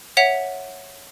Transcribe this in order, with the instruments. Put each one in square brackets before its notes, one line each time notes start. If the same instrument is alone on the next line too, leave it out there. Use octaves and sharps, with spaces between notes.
[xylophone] C#5 E5 F#5 B6 F7